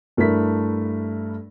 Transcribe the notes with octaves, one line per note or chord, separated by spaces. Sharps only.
G2 A3 D4 E4 A#4 B6